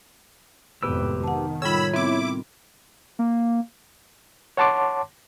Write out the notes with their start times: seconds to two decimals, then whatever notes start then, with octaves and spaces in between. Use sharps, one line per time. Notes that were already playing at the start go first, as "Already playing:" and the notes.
0.83 G#1 F2 A2 C3 B3 G4 B4 E6
1.24 D#3 F#5 A5
1.62 A2 G3 F4 C#5 B5 E6
1.94 B3 C4 E4 D6
3.19 A#3
4.57 C#5 F#5 A5 C6 D6